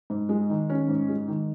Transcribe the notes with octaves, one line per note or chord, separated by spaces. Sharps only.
G#2
G#3
D#3
C#4
G#2
G#3
D#3